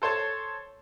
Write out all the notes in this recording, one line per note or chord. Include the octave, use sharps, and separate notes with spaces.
A4 C5 C#5 A5